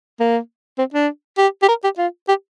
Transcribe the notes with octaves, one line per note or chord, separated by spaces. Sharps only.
A#3
C4
D4
G4
G4
A#4
G4
F4
G4